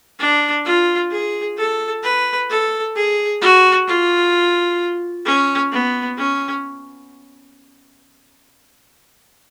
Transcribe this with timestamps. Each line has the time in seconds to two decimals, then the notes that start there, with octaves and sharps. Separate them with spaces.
0.19 D4
0.65 F4
1.11 G#4
1.57 A4
2.03 B4
2.50 A4
2.96 G#4
3.41 F#4
3.88 F4
5.26 C#4
5.72 B3
6.18 C#4